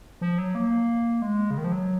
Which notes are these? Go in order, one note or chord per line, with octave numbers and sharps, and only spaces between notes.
F3
F#3
A#3
G#3
C#3
D#3
F3
F#3